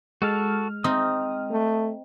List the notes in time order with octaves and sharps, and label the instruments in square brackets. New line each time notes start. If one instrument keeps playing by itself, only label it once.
[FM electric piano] G#3 F6 [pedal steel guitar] F#4 A4 A5
[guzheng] C4 D#4 [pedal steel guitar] D#6
[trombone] A3